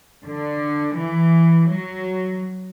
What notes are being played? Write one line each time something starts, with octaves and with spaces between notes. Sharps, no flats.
D3
E3
F#3